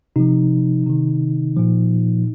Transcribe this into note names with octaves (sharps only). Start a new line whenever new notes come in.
C3 F3 D#4
C3 D#3
A#2 F3